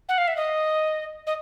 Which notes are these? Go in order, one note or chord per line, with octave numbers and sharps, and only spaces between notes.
F#5
F5
E5
D#5
D#5